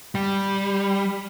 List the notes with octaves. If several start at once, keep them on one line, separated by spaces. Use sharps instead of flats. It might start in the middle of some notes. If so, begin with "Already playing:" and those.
G3